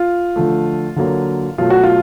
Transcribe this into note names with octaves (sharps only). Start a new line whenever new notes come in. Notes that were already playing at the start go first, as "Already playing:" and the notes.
Already playing: F4
D3 F3 A3
D3 F#3 A#3
B2 F#3 A3 F4
F#4
F4